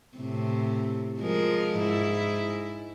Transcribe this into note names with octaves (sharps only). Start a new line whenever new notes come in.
A2 C3
F3 G#3 A#4
G#2 E4